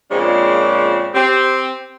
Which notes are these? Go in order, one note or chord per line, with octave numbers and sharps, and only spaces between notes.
A#2 C#3 F3 G#3 C4 D4
C4 G4